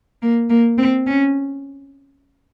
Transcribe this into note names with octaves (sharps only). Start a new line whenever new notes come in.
A#3
A#3
C4
C#4